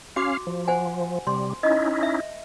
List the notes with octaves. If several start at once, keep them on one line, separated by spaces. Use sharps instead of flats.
C#4 F#4 F5 D6
F3
C5 F#5 G#5
C3 G3 C6
C#4 D#4 E4 D#5
E5